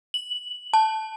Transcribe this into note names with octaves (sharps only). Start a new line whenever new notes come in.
F#7
A5